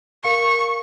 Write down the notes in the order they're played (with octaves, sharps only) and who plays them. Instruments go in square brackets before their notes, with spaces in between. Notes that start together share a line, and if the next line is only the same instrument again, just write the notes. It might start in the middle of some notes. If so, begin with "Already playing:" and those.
[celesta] A#4 F5 C#7 [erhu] C#6